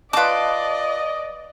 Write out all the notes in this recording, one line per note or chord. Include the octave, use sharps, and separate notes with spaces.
F4 B4 D5 D#5 A5 D6